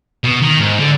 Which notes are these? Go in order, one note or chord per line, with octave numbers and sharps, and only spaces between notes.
B2
D#3
G#2
D3